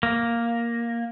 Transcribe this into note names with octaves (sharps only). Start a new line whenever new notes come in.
A#3